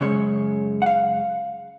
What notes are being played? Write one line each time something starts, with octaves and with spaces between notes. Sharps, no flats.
F#2 C#3 G#3 C#4 C#5
F#5
F5